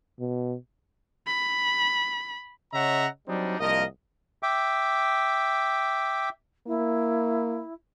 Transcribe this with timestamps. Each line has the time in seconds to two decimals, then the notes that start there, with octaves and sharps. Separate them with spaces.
0.19 B2
1.27 B5
2.73 C#3 C#5 D#5 E5 F#5 A#5
3.28 F#3 G3 C4 D4 D#4
3.60 C2 F3 A#3 A#4 D#5
4.43 E5 G5 D6
6.67 A#3 E4